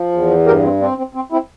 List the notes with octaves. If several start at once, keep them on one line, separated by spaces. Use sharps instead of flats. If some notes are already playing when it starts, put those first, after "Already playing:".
Already playing: F3
E2
G2 G4 A#4
C4
C4 D4
C4
C4
C4 E4